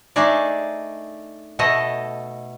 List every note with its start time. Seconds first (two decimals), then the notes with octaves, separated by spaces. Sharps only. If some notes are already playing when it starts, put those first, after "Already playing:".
0.16 A3 D4 D#4 G#4 D5
1.59 B2 A3 A4 D#5